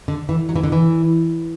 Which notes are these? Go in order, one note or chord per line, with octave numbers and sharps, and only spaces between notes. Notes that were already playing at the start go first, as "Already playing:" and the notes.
D3
E3
F#3
E3
D3
E3